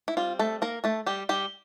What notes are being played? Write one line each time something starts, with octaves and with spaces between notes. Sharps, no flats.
E4
G3 C4 F4
A3 A4
A#3 A#4
A3 A4
G3 G4
G3 G4